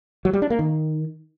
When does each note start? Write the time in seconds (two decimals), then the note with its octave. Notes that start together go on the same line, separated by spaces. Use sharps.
0.25 F#3
0.33 G3
0.42 D4
0.50 A#3
0.59 D#3